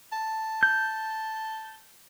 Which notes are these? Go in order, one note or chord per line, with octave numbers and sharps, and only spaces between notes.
A5
G6